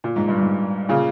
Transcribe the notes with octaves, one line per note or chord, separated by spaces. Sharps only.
A#2
G#2
G2
G#2
A#2 C#3